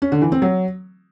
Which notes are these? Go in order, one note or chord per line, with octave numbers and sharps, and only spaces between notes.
C#4
D3
E3
C4
F#3